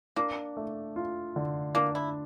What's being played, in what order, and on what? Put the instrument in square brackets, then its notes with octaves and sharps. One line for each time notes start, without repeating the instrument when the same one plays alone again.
[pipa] A#3 [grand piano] D4
[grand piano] A3
F4
D3
[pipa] A#3 [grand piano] D4
[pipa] E4